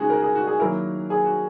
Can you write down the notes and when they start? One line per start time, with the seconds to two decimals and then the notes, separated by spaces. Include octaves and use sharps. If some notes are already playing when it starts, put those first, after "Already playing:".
Already playing: C#3 G#3 D#4 F#4 G#4
0.10 A#4
0.22 G#4
0.35 F#4
0.47 G#4
0.59 D#3 F#3 A#3 E4 A#4
1.10 G#4
1.24 F#4